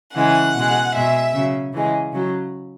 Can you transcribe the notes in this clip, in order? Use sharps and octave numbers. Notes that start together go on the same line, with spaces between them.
C#3 E3 G#3 F#5
B2 G#3
B2 G#3 E5
C#3 F#3
C#3 E3 G#3
C#3 F#3